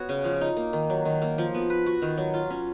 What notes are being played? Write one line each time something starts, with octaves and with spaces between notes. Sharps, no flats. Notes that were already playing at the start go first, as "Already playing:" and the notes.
Already playing: B3 F#4 C#5
C#3
F3
D#4
A#3
D#3
F#3
D#3
A#3
F3
B3
B4
F#4
D#3
F#3
F4
C#4